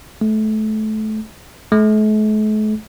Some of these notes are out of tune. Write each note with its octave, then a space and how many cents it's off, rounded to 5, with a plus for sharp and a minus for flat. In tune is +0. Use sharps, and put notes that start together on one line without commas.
A3 -25
A3 -45